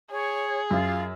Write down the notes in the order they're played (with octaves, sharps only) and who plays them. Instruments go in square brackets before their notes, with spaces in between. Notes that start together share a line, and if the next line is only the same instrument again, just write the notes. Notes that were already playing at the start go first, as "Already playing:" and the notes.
[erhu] G#4 [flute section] C#5
[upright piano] F#2 [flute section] F4